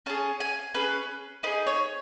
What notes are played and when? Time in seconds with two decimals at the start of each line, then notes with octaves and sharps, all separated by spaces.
0.06 C#4 G#4 A5
0.40 G#5
0.74 C#4 G#4 B4
1.43 D#4 B4
1.47 G#4
1.67 C#5